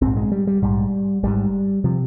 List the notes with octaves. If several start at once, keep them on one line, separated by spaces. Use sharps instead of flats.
A#1 G#2 C4
G#3
G3
G3
A#1 G#2 G3
G#1 G#2 G3
C3 F3